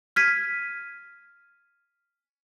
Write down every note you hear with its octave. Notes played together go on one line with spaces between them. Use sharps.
F6 G#6 B6 D#7